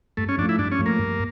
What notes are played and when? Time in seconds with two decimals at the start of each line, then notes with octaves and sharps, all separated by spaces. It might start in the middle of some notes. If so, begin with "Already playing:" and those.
0.17 G2 A3
0.29 C#4
0.38 F3 D4
0.43 A3
0.49 E4
0.59 G2 D4
0.72 C#4
0.79 F3 A3
0.86 A#3
0.99 G2